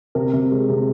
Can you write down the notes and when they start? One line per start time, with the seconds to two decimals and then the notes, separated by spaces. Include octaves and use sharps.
0.15 C3 A#4
0.33 C3
0.52 G#3
0.69 C3